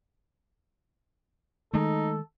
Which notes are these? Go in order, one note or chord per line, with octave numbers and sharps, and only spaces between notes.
D#3 G#3 A3 D#4 A4